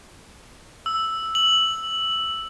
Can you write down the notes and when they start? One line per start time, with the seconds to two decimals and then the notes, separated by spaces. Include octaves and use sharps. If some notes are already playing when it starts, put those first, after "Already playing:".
0.86 E6
1.35 F#7